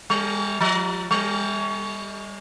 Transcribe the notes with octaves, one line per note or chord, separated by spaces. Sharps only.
G3
F3
G3